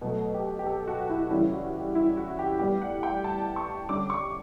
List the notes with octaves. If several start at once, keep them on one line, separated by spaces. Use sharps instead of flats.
B2 F#3 A3
G4
G4
A4
F#4
E4
C#3 E3 G3 C#4 E4
F#4
G4
E4
F#4
G4
A2 G3 B3 G4
F#5
G5
A5
C#6
D3 G3 C#4 D6
C#6